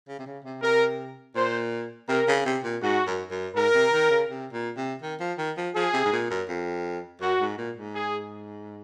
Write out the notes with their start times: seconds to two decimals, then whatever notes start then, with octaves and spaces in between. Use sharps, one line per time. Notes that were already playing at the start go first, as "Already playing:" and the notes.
0.08 C#3
0.19 C3
0.26 C#3
0.45 C3
0.62 C3 A#4
1.35 A#2 C5
2.09 C3 A#4
2.28 C#3
2.45 C3
2.64 A#2
2.82 G#2 F#4
3.07 F#2
3.31 F#2
3.55 G#2 A#4
3.74 C3
3.93 D#3
4.11 C#3
4.29 C3
4.52 A#2
4.77 C3
5.02 D#3
5.20 F3
5.38 D#3
5.57 F3
5.75 F3 G#4
5.94 C3
6.05 G#2
6.12 A#2
6.30 F#2
6.48 F2
7.21 F#2 F#4
7.41 G#2
7.58 A#2
7.77 G#2
7.95 G#4